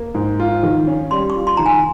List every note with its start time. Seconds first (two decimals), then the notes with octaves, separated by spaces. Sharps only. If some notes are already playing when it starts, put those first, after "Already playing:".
Already playing: A#3
0.15 G#2
0.40 F4
0.63 D#3
0.87 C#4
1.11 G3 C6
1.30 C#6
1.36 F4
1.47 C6
1.57 D#3 A#5
1.66 G#5